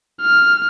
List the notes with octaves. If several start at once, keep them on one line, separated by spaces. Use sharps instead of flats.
F6